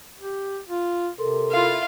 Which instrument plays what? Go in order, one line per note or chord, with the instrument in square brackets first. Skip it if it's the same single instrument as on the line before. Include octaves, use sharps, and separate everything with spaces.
[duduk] G4
F4
[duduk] C3 [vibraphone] A4 A#4 C6
[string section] E4 F4 [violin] F5